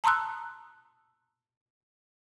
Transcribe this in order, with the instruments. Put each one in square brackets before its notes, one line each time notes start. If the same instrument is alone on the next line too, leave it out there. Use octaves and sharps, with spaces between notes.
[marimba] A5 A#5 C6 D#6 E6 F#6